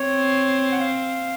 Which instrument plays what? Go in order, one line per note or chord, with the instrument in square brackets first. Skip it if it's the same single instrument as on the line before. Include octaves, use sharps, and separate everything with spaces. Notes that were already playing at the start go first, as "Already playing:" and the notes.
Already playing: [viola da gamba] C4 [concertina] C#5
[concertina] F#5
F5